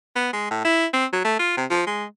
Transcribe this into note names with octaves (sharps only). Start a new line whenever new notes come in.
B3
G#3
A2
E4
C4
F#3
A3
F4
C3
F3
G#3